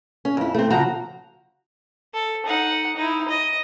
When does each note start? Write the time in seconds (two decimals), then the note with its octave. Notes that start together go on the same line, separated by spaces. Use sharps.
0.25 C#4
0.37 F2 E4
0.55 A3 C4
0.70 C#3 F3 F#4 A#5
2.14 A4
2.46 D#4 F#5
2.96 D#4 E4
3.28 D#5